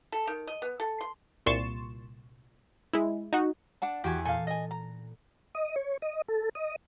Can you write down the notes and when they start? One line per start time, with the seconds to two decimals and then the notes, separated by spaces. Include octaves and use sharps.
0.12 A4
0.27 D#3
0.47 D#5
0.62 B3
0.80 A4
1.01 C6
1.46 C2 A#2 C6 C#6 A6 E7
2.93 G#3 E4
3.33 D#4 F#4
3.82 D4 F#5 A5
4.04 E2 F#4 G4 G#5
4.25 A#2 A4 F5 G#5
4.47 D#5 G#5
4.71 A#5
5.55 D#5
5.76 C#5
6.02 D#5
6.28 A4
6.55 D#5